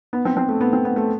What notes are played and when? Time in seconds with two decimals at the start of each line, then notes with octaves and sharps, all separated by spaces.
0.13 B3
0.25 C4
0.37 C4
0.49 A3
0.61 B3
0.73 C4
0.85 B3
0.96 A3